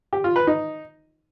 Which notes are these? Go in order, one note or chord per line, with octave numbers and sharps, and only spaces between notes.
G4
F4
B4
D#4